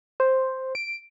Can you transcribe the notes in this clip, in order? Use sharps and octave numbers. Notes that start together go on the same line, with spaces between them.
C5
D7